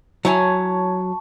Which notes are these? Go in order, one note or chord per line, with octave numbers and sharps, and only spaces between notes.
F#3 E4 C#5 G#5 A5 C#6